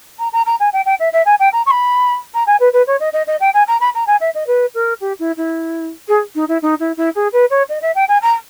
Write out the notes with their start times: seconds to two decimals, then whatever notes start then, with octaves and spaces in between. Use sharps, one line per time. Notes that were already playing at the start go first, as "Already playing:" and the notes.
0.18 A#5
0.32 A#5
0.46 A#5
0.60 G#5
0.73 G5
0.85 G5
0.99 E5
1.12 E5
1.25 G#5
1.39 G5
1.52 A#5
1.66 C#6
1.70 B5
2.33 A#5
2.46 G#5
2.60 B4
2.72 B4
2.87 C#5
3.00 D#5
3.13 D#5
3.27 D#5
3.40 G5
3.53 G#5
3.67 A#5
3.80 B5
3.94 A#5
4.07 G#5
4.20 E5
4.34 D#5
4.47 B4
4.74 A#4
5.00 G4
5.19 E4
5.37 E4
6.07 G#4
6.35 D#4
6.48 E4
6.62 D#4
6.79 E4
6.97 E4
7.15 G#4
7.32 B4
7.50 C#5
7.69 D#5
7.81 E5
7.95 G5
8.08 G#5
8.21 A#5